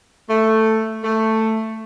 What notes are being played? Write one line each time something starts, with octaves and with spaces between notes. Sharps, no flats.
A3
A3